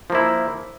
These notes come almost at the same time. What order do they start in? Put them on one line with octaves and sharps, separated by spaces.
F3 A#3 E4